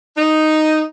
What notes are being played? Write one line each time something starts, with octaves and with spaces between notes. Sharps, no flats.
D#4